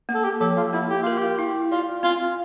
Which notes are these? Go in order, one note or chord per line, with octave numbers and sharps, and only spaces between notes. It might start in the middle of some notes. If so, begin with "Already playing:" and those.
A#3
A4
G4
F3 A4
F4
A#3 E4
G4
F4 A#4
G4
E4
F4 D5
C4 F4